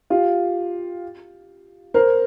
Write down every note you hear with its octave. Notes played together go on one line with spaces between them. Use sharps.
F4 G4
A#4 C5